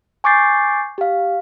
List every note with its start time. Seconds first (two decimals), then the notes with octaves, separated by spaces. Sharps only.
0.24 G#5 C#6 D6 G6 A6 C7
0.98 G4 F5